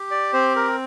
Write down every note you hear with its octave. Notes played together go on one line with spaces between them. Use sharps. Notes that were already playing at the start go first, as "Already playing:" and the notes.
Already playing: G4
D5
C4 C5
A#4